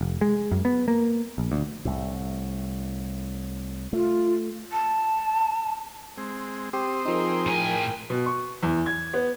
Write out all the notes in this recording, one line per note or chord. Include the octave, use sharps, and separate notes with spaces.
F1
G#3
F#2
B3
A#3
A#1
D2
C2 A2
A3 F4
A5
G#3 C4
C4 G4 C5 D#6
F3 D#4 G#4 A#4 G5
A2 G#5
B2
C#6
E2
G#6
B3